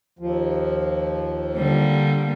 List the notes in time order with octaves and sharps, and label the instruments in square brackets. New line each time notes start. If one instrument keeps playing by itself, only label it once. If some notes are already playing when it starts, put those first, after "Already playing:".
[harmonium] D#2 F3
[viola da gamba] D3 G3 A#3